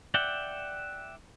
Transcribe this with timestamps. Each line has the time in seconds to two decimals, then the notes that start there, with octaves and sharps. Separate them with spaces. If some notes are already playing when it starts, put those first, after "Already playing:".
0.14 D5 E5 F#5 G5